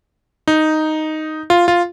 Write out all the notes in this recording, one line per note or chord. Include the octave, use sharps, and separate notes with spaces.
D#4
F4
F4